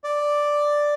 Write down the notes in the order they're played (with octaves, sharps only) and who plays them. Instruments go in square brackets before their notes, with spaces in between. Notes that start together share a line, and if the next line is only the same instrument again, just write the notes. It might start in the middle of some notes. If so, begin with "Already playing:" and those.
[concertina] D5